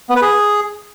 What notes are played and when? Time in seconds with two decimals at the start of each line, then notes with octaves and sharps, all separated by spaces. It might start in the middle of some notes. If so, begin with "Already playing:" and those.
0.10 B3
0.16 B4
0.22 G#4